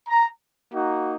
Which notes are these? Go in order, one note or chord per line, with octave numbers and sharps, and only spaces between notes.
A#5
A#3 D#4 F#4